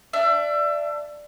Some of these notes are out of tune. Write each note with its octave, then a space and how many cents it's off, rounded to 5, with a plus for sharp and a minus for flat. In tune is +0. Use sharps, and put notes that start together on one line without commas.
D4 +5 E5 +30